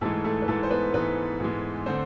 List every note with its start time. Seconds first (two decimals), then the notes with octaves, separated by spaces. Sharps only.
0.01 G#2 E3 G#3 A3 A4
0.24 A3 A4
0.42 B4
0.48 G#2 E3 G#3 A3 A4
0.63 C5
0.71 B3 B4
0.94 G#2 E3 G#3 B3 B4
1.40 G#2 E3 G#3
1.86 D3 A3 C4 C5